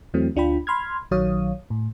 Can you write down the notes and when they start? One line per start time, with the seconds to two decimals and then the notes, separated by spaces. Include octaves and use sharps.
0.14 E2 E3 F#3 A3 C4
0.36 D2 D4 F4 G5 B5
0.67 B5 C6 F6 G#6
1.11 A#1 D#3 F#3 C#5 F5 D#6
1.70 A2